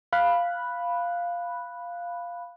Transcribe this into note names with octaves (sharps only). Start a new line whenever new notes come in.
F5 B5 F#6